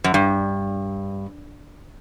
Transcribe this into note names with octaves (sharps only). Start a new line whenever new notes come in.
F#2
G2